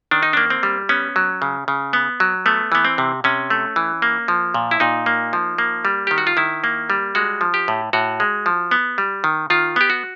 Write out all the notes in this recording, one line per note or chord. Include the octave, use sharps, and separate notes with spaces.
D#3 D4
D#4
A#3 D4
C4
G3
B3 C#4
F#3
C#3
C#3
B3
F#3
A3 B3
E3 B3
C4
C3
C3 C#4
A3
E3
A#3
F3
A#2
E4
A#2 D#4
A#3
F3
A#3
G3
D#3 G4
F#4
F4
D#3 E4
A#3
G3
G#3 F#4
F3
G4
A2
A2 F#4
G#3
F3
B3
G3
D#3
D#3 F4
B3 G4
F#4